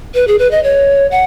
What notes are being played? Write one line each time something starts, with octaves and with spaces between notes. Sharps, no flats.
B4
G#4
B4
D#5
C#5
F#5